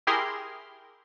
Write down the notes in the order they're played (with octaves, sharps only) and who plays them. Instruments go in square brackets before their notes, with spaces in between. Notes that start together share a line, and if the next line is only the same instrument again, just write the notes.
[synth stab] E4 G4 G#4 A#4 C6